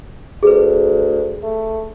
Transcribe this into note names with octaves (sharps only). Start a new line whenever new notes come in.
D2 G#4 B4
A3